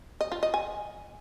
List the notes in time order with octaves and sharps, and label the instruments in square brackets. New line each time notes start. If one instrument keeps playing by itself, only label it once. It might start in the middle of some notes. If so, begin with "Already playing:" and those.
[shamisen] D#5
F4
D#5
G#5